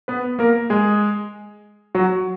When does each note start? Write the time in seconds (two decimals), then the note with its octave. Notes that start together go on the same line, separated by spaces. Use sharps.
0.08 B3 B4
0.39 A#3 A#4
0.70 G#3 G#4
1.95 F#3 F#4